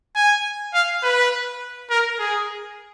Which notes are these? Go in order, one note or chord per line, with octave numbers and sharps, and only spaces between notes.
G#5
F5
B4
A#4
G#4